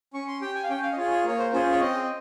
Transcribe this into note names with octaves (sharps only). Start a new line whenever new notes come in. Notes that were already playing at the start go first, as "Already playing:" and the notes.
C#4 C#6
C6
G4 G5
G#5
F5
C#4 G5
F5
D#5
F4 G#4 C#5
C#5
A#3 C#5
C5
C#4 F4 G#4 C5
C#5
C4 D#5